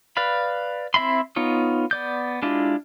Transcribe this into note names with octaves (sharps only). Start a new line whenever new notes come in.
B4 D5 F5 B5
C4 E4 E5 B5 C6
B3 D#4 F4 C#5
B3 D5 G6
G#3 D4 E4 F4 G4